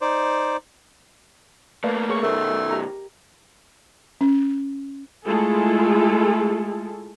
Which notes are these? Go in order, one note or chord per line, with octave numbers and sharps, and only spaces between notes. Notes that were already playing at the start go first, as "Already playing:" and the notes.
D#4 C5 D5
A3 A#3 B4 D5 F5
G#4 C#5 C#6
B2 D#3 A3 A#4 C5
G4 A#5
C#4
G#3 A3 E4 F4 G#4 A4